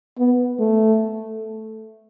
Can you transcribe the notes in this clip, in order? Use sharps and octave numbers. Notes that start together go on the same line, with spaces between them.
B3
A3